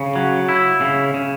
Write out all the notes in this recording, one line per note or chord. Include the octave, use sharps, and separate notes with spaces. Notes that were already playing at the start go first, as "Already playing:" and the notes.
Already playing: C#3
F#3
E4
C#3
C#3